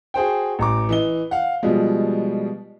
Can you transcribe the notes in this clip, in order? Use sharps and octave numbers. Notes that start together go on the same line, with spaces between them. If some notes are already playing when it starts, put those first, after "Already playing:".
F#4 G#4 C5 G5
A1 A#5 D6
E3 D#5 G7
F5 F#5
B2 F3 G3 G#3